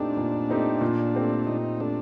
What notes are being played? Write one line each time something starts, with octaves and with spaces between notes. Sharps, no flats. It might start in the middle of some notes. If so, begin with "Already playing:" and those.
Already playing: A#2 A3 C4 D4 D#4 G4
A#2
A3 C4 D#4 G4
A#2
A3 C4 G4
A#2 D#4
A3 C4 D4 G4